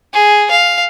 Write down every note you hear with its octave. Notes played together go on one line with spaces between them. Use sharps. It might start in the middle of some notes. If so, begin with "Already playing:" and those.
G#4
F5